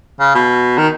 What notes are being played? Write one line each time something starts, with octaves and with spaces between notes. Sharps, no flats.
C#3
B2
D#3